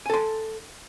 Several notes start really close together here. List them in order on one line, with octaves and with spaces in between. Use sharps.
G#5 A4 C6